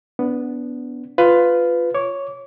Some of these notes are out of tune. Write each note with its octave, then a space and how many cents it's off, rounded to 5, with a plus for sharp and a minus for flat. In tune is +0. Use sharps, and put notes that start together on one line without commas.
B3 +0 D4 -25
F4 +0 B4 +15
C#5 +0 D6 -25